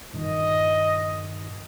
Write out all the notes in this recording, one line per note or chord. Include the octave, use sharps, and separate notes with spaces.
G2 A#2 D#3 D#5